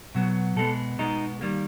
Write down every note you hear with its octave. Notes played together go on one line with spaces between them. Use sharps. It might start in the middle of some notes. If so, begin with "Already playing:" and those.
B2 F#3 B3
B2 G#3 B3 A4
B2 G#3 B3 D#4
D#3 G3 A#3